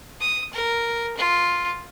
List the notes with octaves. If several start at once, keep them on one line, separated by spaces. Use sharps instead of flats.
D#6
A#4
F4